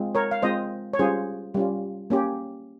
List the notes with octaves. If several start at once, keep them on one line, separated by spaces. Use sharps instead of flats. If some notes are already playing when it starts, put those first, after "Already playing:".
Already playing: G#3 C4 F4
A#4 C#5
F5
G#3 C4 F4 C5 D#5
C#5
G3 C#4 F4 G#4 C5
G3 C#4 F4
A#3 C#4 G4